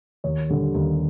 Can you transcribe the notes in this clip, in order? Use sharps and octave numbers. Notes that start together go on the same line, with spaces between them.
D#2 C#5
D3 G3
D#2